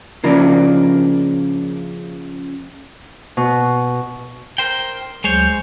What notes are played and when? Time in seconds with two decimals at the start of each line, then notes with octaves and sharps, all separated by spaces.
0.24 C#3 F3 A#3 D4
3.37 B2
4.58 A#4 C5 G5
5.24 D2 F#3 G#3 C5 C#5 G6